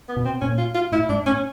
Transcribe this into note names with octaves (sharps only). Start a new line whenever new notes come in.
B3
B2
C4
A#2 C#4
F4
F4
A2 E4
G#2 D4
A2 C#4